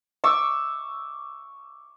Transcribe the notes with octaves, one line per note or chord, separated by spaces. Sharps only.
C#6 D6 E6